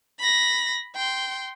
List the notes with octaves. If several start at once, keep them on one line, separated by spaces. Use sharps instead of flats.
B5 A#6
G5 C6